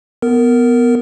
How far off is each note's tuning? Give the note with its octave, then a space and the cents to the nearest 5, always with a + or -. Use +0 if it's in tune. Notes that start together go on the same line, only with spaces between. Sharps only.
B3 +5 A#4 -10